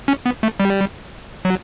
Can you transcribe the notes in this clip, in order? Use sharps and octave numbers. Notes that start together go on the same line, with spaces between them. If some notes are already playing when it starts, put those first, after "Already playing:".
C#4
B3
A3
G3
F#3